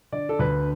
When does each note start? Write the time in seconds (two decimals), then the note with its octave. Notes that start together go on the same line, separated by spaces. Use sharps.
0.12 D3 D5
0.29 A4
0.39 D2 B4